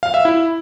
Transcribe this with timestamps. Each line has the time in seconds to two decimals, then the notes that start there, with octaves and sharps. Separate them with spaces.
0.03 F5
0.14 E5
0.25 E4